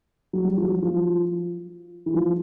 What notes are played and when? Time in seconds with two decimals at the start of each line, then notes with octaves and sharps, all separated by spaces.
0.33 F#3
0.44 G3
0.57 F3
0.63 F#3
0.82 F3
2.06 E3
2.14 F3